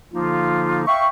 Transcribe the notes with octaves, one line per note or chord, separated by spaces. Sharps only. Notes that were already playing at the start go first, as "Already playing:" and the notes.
D3 F3 A#3 D#4 F4
E5 F5 G5 C#6